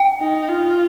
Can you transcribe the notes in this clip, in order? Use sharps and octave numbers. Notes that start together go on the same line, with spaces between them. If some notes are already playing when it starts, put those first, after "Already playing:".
Already playing: G5
D#4
F4